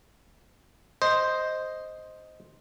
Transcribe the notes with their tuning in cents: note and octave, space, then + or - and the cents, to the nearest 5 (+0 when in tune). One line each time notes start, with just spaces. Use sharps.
C5 +0 D#5 +0